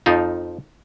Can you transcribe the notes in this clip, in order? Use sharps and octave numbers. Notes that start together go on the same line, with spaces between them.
F2 F3 D#4 F4